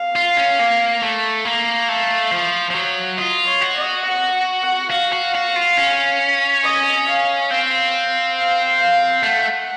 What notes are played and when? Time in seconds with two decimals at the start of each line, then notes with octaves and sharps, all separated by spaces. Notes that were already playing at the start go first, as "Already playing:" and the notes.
Already playing: F5
0.16 F4
0.37 C#4
0.59 A#3
1.02 A3
1.45 A#3 F5
1.89 A3
2.31 F3
2.70 F3
2.75 F#3
3.18 F4 D#5
3.47 C#5
3.61 F#4
3.76 D#5
4.05 F#5
4.63 F#5
4.90 F#4 F5
5.13 F#4
5.35 F#4
5.56 F4
5.77 C#4
6.64 D#5
7.08 F5
7.51 C4 F5
8.37 F5
8.80 F5
9.23 A3 F#5